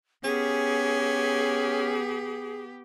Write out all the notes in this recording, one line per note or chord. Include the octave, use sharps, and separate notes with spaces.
B3 C#4 G4 G#4